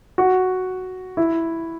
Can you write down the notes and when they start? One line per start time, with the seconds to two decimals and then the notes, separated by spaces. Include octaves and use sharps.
0.18 F#4
1.17 E4